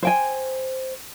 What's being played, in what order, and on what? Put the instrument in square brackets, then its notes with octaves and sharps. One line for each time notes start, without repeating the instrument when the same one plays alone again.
[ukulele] C5 G5 G#5